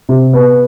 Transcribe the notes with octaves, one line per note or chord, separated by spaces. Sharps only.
C3
B3